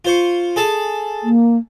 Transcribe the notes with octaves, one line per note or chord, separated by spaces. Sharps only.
F4 C5 C#6
G#4 A4 A5
A#3